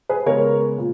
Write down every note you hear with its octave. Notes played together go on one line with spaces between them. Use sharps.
G#4 B4
C#3 G#3 B3 A#4 C#5
A#2